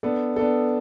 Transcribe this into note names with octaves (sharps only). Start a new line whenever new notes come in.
B3 D4 A4
B3 D4 A4